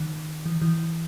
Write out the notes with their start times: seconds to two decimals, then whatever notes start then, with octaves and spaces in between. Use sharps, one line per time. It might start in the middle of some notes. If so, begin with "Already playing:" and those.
Already playing: D#3
0.46 E3
0.62 E3